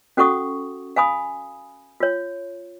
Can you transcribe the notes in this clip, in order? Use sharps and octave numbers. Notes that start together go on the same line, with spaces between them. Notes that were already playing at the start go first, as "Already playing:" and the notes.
C#4 F#4 A4 F#5 C#6 D#6
F5 G#5 B5 D#6
F4 C#5